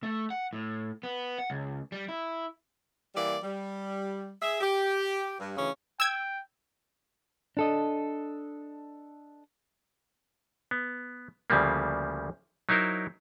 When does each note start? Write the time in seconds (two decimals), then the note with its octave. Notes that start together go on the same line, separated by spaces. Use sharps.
0.03 A3
0.30 F#5
0.53 A2
1.03 B3
1.39 F#5
1.50 C#2
1.92 G3
2.08 E4
3.15 E3 G3 A#3 D5
3.43 G3
4.41 G#4 E5
4.61 G4
5.39 G2
5.57 D2 C#3 E3 C#4
6.00 G5 E6 G#6
7.57 D4 A4 D#5
10.71 B3
11.50 D2 C#3 F3 G3 A#3
12.69 F#3 D#4 E4 A#4 C5